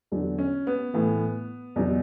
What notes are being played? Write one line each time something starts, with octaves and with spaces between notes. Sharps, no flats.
E2 D3 F#3
C#4
B3
A2 E3
E2 B2 F#3